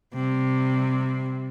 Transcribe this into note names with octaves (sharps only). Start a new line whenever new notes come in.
C3 G3